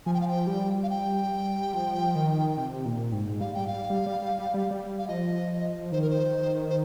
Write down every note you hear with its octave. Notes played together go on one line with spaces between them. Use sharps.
F3 G#5
G5
F5
G5
G3
F5
G5
F3
D#3
C3
A#2
G#2
G3 F5
G3 G5
F5
G3
G3
G3
G3
G3
G3
G3
F5
F3 D#5
D#3 C5
A#4
C5
C5